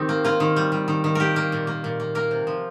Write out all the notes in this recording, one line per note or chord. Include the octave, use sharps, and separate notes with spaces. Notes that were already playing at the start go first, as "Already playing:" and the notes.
Already playing: D#3 C4 D#4 G4
A#3
A#3 F4
D#3
G3
G3
D#3
D#3
A#3 G4 A#4
A#3
A#2
A#3
A#2
A#3
A#3 A#4
C3
F3